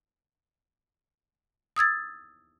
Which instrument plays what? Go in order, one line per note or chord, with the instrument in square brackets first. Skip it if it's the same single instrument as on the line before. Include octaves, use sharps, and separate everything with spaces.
[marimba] D#6 E6 G#6 A6